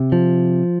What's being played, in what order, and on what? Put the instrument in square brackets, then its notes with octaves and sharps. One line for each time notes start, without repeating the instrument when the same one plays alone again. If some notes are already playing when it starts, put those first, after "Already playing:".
Already playing: [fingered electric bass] C3
F3